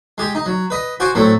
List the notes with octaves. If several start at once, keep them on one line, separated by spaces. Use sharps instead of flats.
G#3 G4
D#4
F#3
B4 D#5
F#4 C5 G#5 C6 D6
A2 F#3 A3 C4